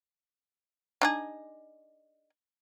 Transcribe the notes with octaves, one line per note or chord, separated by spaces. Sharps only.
D4 D#4 G#4